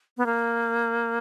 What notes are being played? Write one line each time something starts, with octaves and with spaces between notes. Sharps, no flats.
B3
A#3